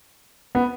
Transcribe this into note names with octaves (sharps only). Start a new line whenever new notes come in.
B3